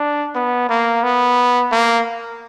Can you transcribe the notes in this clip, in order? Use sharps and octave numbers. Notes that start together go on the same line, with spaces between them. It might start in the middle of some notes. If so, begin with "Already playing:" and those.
Already playing: D4
B3
A#3
B3
A#3